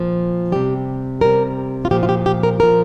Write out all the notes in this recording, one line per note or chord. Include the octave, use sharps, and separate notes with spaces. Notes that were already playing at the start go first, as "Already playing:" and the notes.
Already playing: A#2 F3
C3 G3 G4
C3 G3 A#4
F4
A#2 F3 G4
F4
G4
G4
A#4
A#2 F3 A#4